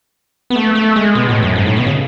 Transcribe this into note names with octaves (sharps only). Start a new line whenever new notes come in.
B3
A3
A3
G#3
B2
A2
F#2
G#2
A2
B2
C#3